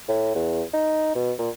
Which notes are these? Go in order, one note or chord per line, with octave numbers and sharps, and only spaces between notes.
A2
E2
D#4
B2
A#2